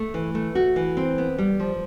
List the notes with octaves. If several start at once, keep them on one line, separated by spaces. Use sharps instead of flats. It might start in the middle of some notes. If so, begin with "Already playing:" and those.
Already playing: A3
E3
A3
F#4
E3
C4
B3
G3
F3